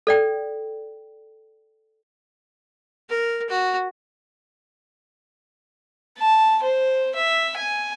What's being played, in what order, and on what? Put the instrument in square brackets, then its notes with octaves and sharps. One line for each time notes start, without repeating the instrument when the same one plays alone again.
[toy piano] A4 D5 G5
[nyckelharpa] A#4
F#4
[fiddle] A5
C5
E5
G#5